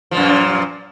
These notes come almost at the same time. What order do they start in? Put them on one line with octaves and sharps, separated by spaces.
F3 A#2 F#2